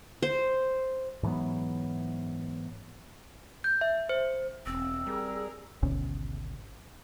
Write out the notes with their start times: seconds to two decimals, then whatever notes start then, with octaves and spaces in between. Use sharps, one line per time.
0.22 C5
1.23 G#2 E3 F#3 B3
3.64 G6
3.81 E5
4.09 C5
4.66 E1 C4 E6
5.06 G3 G#4 A#4
5.83 G#1 D2 B2 C#4